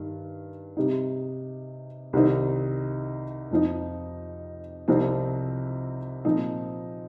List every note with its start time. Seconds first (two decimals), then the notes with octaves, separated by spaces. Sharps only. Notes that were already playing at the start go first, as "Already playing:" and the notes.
Already playing: G2 D#3
0.77 C3 G3 D#4
2.13 C2 C3 D#3 C4 D#4
3.51 F2 F3 D#4
4.88 C2 C3 F3 C4 D#4
6.25 A#2 F3 C4 D#4